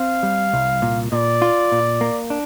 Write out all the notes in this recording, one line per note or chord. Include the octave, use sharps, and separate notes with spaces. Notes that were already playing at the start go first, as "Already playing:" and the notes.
Already playing: C4 F5
G3
C2
A#2
A#2 D5
F4
A#2
A#3
D4